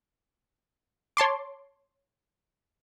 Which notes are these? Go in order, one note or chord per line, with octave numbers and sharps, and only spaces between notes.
C#5 A5 C6 D6